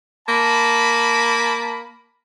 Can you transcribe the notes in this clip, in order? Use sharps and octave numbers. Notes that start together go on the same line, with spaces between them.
A#3 A5 B5